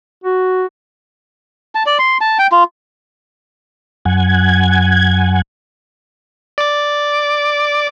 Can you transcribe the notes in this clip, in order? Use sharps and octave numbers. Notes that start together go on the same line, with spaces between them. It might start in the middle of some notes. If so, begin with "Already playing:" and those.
F#4
A5
D5
C6
A5
G5
F4
F#2 F#5 G#5 G#6
D5 D6